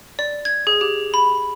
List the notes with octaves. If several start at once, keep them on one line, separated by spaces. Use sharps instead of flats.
D5
G#6
G#4
G4
B5